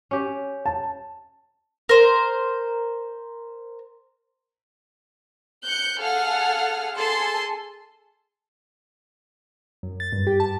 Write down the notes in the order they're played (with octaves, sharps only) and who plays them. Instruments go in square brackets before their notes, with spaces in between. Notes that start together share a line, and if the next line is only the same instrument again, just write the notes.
[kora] C#4 G4
[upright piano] A5
[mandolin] A#4 C5
[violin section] F#6 G6 C#7
G#4 A4 F5 F#5 F6
G#4 A4 A5 C6
[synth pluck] F#2
A6
G2
G4
A5